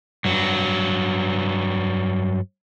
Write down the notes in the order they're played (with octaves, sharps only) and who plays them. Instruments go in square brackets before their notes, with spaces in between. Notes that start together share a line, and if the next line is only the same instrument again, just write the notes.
[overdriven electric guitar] G2 F#3